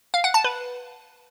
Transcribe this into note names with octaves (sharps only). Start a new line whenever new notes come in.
F5
F#5
A5
B4